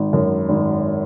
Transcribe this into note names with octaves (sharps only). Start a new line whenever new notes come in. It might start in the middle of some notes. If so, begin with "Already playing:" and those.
Already playing: G#1
F#2
G#1